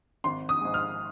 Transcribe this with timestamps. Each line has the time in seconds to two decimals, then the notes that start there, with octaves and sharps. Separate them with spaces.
0.24 G#1 C6
0.49 D#6
0.61 G#2 G#3
0.74 F6